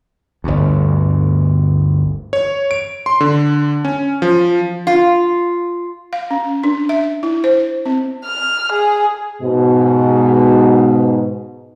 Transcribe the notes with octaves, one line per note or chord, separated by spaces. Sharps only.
G1 D2
C#5
D7
C6
D3
C#4
F3
F4
F5
C#4
D4
E5
E4
C5
C4
F6
G#4
G#2 B2